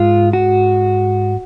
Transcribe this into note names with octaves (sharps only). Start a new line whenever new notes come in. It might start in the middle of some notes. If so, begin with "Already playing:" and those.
Already playing: G#2 G#3 F4
F#4